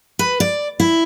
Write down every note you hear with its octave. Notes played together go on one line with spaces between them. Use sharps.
B4
D5
E4